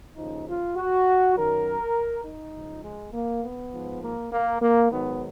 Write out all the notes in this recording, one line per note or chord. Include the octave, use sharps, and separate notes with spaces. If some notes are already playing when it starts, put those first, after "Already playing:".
D#2 C#3 F3 D#4
F4
F#4
F#2 D#3 F#3 A#4
D#4
C#2 C#3 F3
G#3
A#3
B3
G#2 F3
A#3
A#3
A#3
G#2 D#3 F#3 B3